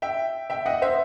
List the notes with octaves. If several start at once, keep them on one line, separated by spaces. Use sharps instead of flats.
E5 G5
E5 G5
D#5 F#5
C5 E5